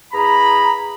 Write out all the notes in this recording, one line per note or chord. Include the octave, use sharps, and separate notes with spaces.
E2 G#4 A#5 B5